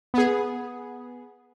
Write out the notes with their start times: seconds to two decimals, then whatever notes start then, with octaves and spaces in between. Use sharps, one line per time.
0.14 B3 G#4